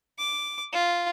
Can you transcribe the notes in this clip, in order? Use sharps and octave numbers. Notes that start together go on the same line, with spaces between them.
D6
F4